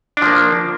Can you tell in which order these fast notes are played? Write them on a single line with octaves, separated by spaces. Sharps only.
D4 F3 A#3